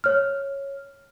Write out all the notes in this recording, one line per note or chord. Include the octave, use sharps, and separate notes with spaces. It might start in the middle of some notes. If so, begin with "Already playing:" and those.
C#5 F6